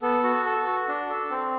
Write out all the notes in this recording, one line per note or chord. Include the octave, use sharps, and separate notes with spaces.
B3 A4
F#4
A4
F#4
D4
A4
C4